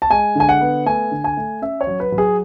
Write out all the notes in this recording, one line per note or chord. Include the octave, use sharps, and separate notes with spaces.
A5
G#3 G#5
D3 G#5
F#5
B3
A3 G#5
D3
G#5
A3
C#4 E5
C#5
F#3
B4
F#3
G#4